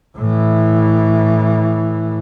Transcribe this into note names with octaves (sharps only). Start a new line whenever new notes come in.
A2 E3